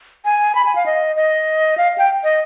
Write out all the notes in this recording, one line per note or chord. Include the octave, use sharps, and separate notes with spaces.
G#5
B5
G#5
F5
D#5
D#5
F5
G5
D#5